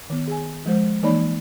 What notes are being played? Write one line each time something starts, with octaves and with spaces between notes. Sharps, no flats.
D#3 B3
G#4 G#5
F3 G#3 C5
E3 A#3 D#4 C#5 D5 B5